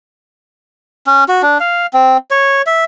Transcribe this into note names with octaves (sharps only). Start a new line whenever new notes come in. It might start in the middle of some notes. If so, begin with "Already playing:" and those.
C#4
F#4
D4
F5
C4
C#5
E5